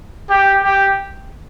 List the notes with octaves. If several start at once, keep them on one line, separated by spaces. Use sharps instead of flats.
G4
G4